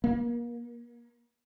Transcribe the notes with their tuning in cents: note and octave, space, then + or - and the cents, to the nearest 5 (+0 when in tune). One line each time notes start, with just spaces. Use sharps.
A#3 +35